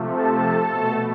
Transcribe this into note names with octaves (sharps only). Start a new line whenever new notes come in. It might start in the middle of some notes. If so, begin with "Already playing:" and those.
Already playing: C3 F3 A3
A4 A5
B2 A3